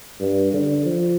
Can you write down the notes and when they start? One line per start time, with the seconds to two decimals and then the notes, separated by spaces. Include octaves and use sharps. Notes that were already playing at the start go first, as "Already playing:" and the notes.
0.21 G2
0.53 D3
0.86 F3